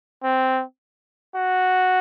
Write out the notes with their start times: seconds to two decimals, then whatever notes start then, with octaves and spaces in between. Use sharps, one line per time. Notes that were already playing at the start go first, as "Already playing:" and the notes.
0.24 C4
1.35 F#4